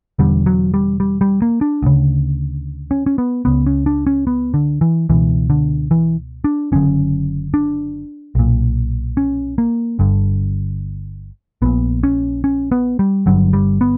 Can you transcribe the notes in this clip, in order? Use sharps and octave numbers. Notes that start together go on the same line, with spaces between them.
E1 E2 D3 G3
F#3
G3
G3
G3
A#3
D4
D2 C#3
C#4
C#4
B3
C#2 C#3 B3
C#4
D4
C#4
B3
D3
E3
C#2 B2 E3
D3
E3
D4
F#1 F#2 D3 C#4
D4
B1 A#2
C#4
A#3
G1 G2 D3
A#1 A#2 B3
C#4
C#4
B3
G3
G1 G2 D3 F#3
G3
B3